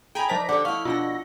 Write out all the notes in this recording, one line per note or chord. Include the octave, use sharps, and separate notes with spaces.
G#4 D#5 G5 G#5 A#5 B5
F3 C5 D5 A5 A#6 B6
D3 G4 D5 F#5 G5 D6
E4 D#5 F5 C#6 F6
B2 D4 F4 F#5 A#6